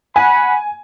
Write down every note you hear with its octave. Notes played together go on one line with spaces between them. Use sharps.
F#5 G#5 B5